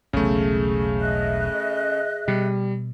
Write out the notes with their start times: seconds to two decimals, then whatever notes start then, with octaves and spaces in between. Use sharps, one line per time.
0.13 E1 B1 C#3 A3 G#4
1.00 D#5 E5 F#6
2.28 B2 G3